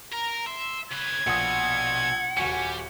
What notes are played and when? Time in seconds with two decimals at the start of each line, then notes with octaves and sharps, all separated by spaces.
0.13 A#4 A#5
0.47 E5 C6
0.92 C#3 B4 G#6
1.27 A#1 B2 F#5 D#6
2.37 D#1 G3 F#4 G#5 C#7